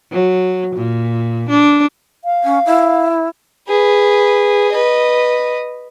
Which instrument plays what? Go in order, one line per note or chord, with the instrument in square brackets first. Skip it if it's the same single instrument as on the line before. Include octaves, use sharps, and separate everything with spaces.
[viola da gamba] F#3
A#2
D4
[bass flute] F5
[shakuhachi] C#4
E4
[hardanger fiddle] G#4 B4
B4 D#5